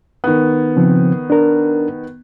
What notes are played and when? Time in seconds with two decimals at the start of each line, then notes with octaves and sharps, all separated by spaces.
0.24 D#3 B3
0.76 C#3 F3 C4
1.30 D4 A#4